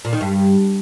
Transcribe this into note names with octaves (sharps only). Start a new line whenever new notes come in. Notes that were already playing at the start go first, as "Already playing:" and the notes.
A#2
D#3
G2